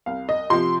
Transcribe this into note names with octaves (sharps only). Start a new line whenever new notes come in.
C2 F5
D#5
C3 F3 C6